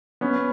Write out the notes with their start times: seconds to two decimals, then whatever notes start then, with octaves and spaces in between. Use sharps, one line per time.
0.21 B3 C#4